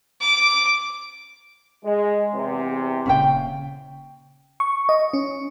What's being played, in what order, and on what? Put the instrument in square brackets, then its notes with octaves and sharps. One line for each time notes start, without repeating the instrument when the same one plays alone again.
[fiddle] D6
[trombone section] G#3
E2 C3
[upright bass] D#1 C#3 [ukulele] C#4 F5 G5
[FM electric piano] C#6
D#5
C#4